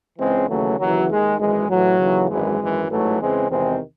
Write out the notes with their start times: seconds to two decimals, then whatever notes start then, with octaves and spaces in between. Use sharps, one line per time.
0.19 C#2 C#3 E3 G#3 C4
0.49 D#2 C#3 E3 F#3 A3
0.79 D#2 C#3 E3 F#3
1.09 D#2 D#3 G#3
1.39 G#1 F#2 E3 G#3
1.69 A1 A2 E3 F#3
1.99 D#2 C#3 E3
2.30 G#1 F#2 E3 G#3
2.60 G#1 F#2 E3
2.89 A1 G#2 E3 F#3 A3
3.20 E2 C#3 E3 G#3 C4
3.50 E2 C3 D#3 G#3 C4